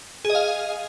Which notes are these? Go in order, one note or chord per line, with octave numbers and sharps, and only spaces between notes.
G#4
D#5
F5